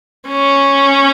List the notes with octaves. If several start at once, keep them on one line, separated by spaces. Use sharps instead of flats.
C#4